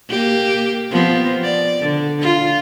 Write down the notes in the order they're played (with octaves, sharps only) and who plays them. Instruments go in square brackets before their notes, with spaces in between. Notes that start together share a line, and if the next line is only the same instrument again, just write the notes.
[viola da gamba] A#3 G4
F3 B3 C4
D5
D3
F4